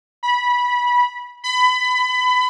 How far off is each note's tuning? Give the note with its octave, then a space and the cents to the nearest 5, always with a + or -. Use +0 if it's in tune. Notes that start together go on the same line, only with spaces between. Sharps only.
B5 -20
B5 +25